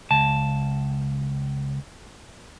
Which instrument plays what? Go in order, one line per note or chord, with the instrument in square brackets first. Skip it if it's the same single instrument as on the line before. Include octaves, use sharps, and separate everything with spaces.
[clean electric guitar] C#2 A5